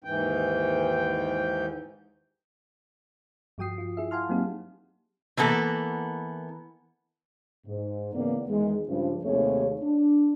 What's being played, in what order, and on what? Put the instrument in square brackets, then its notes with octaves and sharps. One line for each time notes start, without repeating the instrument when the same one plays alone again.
[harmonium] D#2 G#2 E3 G5
[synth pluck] G2 F3 F#4 G5 D#6 C7
F4
E4 G#4 E5
F5 F#5 G#5 A5 C6 F6
F#3 A#3 C4 D#4 G4
[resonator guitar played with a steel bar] E3 A#3 B3 A4
[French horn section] G#2
C#3 E3 A#3 B3 D5
E2 D#3 G#3
G2 C#3 F3
D#2 C3 A3 G#4 C#5
D4